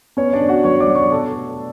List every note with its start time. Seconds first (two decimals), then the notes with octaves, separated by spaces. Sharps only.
0.17 B3 C#4 C#5
0.33 D4 D5
0.41 D3
0.49 F#4 F#5
0.64 F#3 C#5 C#6
0.80 D5 D6
0.87 F#3
0.95 C#5 C#6
1.11 B2 A4 A5
1.35 A3